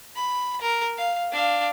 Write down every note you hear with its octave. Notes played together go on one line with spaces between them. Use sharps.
B5
A#4
F5
D4 F5